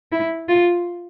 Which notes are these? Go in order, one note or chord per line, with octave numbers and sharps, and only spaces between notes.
E4
F4